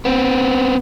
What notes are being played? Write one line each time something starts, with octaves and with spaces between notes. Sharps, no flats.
B3 C4